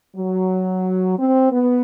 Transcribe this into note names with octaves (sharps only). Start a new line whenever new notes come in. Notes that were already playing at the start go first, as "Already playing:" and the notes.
F#3
C4
B3